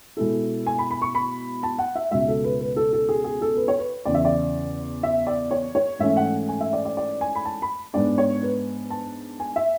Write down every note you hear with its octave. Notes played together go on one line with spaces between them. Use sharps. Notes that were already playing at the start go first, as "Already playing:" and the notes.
B2 G#3 B3 E4 A4
G#5
B5
B5
C#6
B5
A5
F#5
E5
C#2 B2 G#3 E5
A4
B4
B4
A4
A4
G#4
G#4
A4
B4
C#5
B4
E2 C#3 E3 D5
E5
D5
E5
D5
C#5
C#5
G#2 E3 A3 C#4 E5
F#5
G#5
E5
D5
D5
D5
G#5
B5
A5
B5
G#2 G#3 B3 D4 D5
C#5
B4
A5
G#5
E5